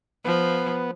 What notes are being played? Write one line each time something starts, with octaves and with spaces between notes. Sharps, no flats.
F3 B3